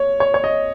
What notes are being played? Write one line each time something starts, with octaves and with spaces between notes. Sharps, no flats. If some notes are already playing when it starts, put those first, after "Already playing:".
Already playing: C#5
C#5
C#5
D#5